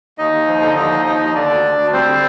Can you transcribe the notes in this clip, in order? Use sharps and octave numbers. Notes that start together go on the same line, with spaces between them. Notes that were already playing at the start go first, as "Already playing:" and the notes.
D#2 D#4 D#5
D#2
F3
D3
D#2 D#4 D#5
F3
D#2 D#4 D#5
D#2
D#5
D3 D4 D5
D2
D2
D2
G3 C4 C5
D3